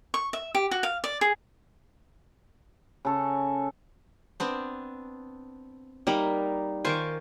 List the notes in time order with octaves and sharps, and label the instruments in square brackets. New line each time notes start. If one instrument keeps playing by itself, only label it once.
[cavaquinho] C#6
E5
G4
F#4
F5
D5
G#4
[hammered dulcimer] C#3 A4 C#5
[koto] B3 C4 D4
[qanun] G3 D#4 B5 [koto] A#3
[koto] D#3 F4 C5 [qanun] G#5 C#6 D6